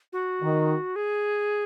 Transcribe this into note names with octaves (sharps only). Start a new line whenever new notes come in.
F#4
D#3
G#4